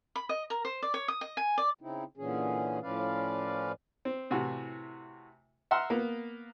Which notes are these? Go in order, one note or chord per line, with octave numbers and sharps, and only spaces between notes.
B5
D#5
A#4
C5
D5
C#5
D#6
D#5
G#5
D5
C#3 C4 D#4 E4
A#2 D3 E3 C#4 G#4
A2 F3 C#4 B4 D5 F5
C4
A2 C3 E3 F#4
E5 F#5 A#5 C6 E6 F6
A#3 B3